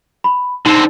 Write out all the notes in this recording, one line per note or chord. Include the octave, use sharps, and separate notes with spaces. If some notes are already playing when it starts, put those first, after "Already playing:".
B5
D3 C4 D#4